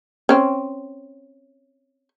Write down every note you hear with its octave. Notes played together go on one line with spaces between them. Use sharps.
C4 C#4